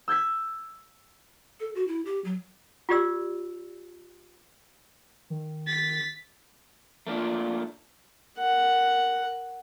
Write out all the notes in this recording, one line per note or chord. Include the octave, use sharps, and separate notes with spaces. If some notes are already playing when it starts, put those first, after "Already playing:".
E6 G6 G#6 B6
A4
F#4
E4
G4
F#3
F4 G4 D5 E6
D#3
A6 B6
A3 A#3 D4 F4
A#4 F#5